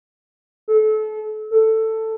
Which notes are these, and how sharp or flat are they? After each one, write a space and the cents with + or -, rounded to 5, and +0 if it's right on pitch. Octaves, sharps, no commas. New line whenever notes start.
A4 -30
A4 +10